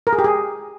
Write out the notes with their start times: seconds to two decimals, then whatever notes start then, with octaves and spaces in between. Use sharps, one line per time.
0.07 A#4
0.13 G#4
0.19 G4
0.24 G#4